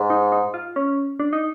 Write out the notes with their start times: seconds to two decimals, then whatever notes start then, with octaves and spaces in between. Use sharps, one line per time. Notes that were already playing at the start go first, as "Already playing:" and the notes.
Already playing: G#2
0.10 D#4
0.32 D#4
0.54 F4
0.76 C#4
1.20 D4
1.33 D#4